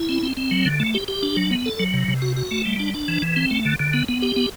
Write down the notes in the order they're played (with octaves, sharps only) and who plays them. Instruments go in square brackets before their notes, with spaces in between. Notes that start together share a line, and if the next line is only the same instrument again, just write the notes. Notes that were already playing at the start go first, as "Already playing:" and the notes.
Already playing: [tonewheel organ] E4
C4
C4
C4
F#3
D3
A3
G4
G4
D4
F#3
B3
A4
F#3
C3
C3
F#4
F#4
A3
G3
D4
D4
E3
E3
C4
A3
D3
D3
B3
B3
G4
B3